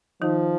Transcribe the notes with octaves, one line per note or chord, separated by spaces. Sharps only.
D#3 F3 D#4